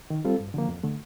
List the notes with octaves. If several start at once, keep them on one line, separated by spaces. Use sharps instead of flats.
D#3
G3 C4 F4 A4
G2
D3 F3 A#3
F2
D3 A3